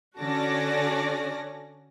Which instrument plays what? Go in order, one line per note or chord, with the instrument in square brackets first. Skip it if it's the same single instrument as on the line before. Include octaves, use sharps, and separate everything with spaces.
[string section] D3 C#4 F#4 A4 D5 A#6